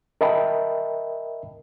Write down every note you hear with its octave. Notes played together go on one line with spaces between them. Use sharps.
A#4 D#5 E5 G5 A5 B5